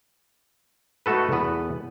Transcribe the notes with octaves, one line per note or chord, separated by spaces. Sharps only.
A3 D#4 F#4 A4 B4
E2 B3 B4